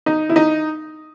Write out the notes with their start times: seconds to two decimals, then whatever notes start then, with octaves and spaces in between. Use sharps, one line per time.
0.06 D#4
0.29 E4
0.36 D#4